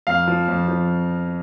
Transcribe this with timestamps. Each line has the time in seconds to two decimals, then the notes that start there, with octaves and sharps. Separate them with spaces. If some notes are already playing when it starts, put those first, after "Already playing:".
0.07 F2 F5
0.27 F3
0.48 F2
0.68 F3